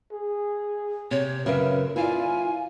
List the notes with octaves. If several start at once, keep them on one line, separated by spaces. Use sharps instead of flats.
G#4
C3 C#5
F#2 C#3 A#4 B4 E5
E4 F4 D5 F5 G#5